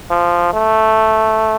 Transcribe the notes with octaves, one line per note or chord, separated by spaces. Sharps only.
F3
A3